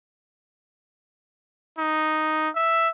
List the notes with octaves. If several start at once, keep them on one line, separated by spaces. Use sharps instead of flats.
D#4
E5